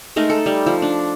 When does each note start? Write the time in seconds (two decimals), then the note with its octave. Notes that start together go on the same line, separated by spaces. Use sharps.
0.16 G#3 A3 D#4 A#4
0.30 A4
0.46 G3
0.66 F3
0.82 D4